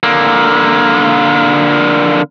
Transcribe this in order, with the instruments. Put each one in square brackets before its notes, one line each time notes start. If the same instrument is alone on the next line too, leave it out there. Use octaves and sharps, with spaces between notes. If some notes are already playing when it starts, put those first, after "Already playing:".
[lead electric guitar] D3 A#3